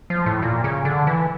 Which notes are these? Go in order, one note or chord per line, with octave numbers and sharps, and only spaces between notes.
F3
A2
A#2
C#3
D3
E3